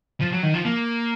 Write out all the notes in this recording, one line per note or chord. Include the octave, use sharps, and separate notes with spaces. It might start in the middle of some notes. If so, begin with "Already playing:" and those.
F3
F#3
D#3
F3
A#3